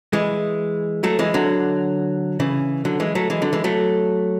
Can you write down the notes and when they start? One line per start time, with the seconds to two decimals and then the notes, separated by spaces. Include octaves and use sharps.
0.13 E3 G#3
1.04 F#3 A3
1.19 E3 G#3
1.34 D3 F#3
2.40 C#3 E3
2.85 D3 F#3
3.00 E3 G#3
3.15 F#3 A3
3.30 E3 G#3
3.42 D3 F#3
3.53 E3 G#3
3.64 F#3 A3